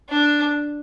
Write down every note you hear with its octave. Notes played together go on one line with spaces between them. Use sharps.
D4